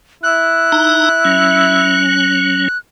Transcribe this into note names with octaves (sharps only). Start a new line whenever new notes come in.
E4 F#6
D#4 A#5
F#3 C#4